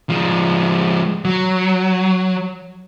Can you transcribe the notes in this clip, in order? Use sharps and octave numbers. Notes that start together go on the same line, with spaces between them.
F3 G#3
F#3